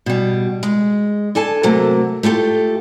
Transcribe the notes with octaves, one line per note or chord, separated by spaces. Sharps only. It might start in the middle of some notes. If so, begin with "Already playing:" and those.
B2 G3
G#3
D4 A4 G#5 A5
C3 F#3 A3 A#3
A3 F4 G4 A4